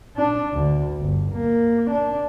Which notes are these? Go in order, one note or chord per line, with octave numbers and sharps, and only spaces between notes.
D4
D2
G1
A#3
D4